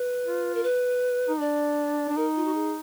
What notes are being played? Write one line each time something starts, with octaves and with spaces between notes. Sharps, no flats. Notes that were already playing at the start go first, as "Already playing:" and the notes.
Already playing: B4
F4
A#4
B4
D#4
D4 D5
D4
D#4 A#4
F4
F#4
G#4